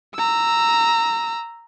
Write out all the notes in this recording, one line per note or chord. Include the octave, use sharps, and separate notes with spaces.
A#5 E6